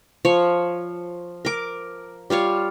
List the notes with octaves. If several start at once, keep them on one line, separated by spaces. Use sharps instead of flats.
F3 C#5
A#4 D6
G3 F4 C#5 F5